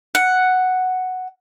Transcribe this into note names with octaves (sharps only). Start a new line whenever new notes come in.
F#5